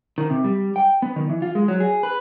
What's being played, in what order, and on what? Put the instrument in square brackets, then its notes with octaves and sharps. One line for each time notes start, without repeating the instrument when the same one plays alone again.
[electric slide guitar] D#3
C3
G3
G5
B3
D#3
E3
F4
G#3
F#3
G#4
B4